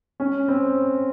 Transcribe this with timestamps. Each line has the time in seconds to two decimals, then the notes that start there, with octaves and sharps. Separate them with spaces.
0.20 C#4
0.48 C4